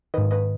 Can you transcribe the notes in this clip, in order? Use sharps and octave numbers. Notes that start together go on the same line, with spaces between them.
G#2 D#3 B4 D#5
B4 D#5